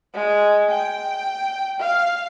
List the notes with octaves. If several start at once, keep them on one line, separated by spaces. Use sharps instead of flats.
G#3
G5
F5